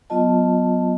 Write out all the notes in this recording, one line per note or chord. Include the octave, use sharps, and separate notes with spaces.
F#3 B3 F4 D#5 A5